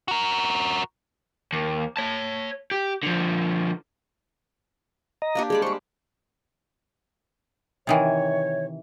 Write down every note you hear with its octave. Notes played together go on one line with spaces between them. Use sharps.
F#4 A#4
D#2
C#5 A5
G4
D3 F3
D#5 A#5
A#3 D4 G4
G3 G#3 G#4 D5
G4 C5 C#6
C3 D#3 E3 C#5